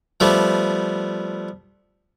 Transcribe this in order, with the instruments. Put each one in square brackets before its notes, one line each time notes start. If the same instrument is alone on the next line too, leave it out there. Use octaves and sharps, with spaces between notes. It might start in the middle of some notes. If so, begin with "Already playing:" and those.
[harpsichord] F3 G3 A3 B3